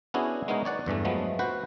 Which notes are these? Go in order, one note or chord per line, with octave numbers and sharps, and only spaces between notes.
B3 C#4 D4 E4 F#4 G#4
G#3 B3 D#4 A#4 C#5
C#5 D5 F#5
E2 G2 E3 A3
F3 F#3 G#3 A3 B3
F#4 B4 C5 F#5